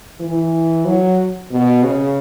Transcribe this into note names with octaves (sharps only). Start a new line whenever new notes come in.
E3
F#3
B2
C#3